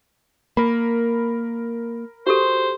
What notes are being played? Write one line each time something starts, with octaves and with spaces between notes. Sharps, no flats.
A#3 A#4 B5
F#4 G4 A4 C5